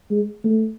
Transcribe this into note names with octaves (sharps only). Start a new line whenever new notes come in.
G#3
A3